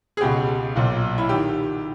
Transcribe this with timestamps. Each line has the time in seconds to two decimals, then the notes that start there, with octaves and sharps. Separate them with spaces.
0.17 G#4
0.21 C#2 B2 G4
0.76 B1 A#2
1.18 E4
1.29 D#3 G4